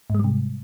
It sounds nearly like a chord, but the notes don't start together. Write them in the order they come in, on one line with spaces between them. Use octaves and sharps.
G#2 G#3 G3 C3